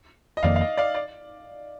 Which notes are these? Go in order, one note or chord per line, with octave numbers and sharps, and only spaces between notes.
D#5
F1 F2 D#3 A#3 D5 F5
F5
D#5
D5 F5
D5